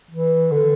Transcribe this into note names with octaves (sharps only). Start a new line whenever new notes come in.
E3
D3